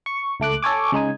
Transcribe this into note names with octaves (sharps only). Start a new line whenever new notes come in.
C#6
C#2 A3 D6 F#6
A4 C#5 G#5 D6
C#3 G#3 D#4 G#5